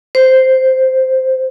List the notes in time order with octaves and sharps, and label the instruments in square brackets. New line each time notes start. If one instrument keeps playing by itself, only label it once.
[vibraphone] C5